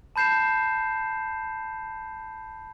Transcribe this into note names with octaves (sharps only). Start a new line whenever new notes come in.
A5 B5 G6 C7 E7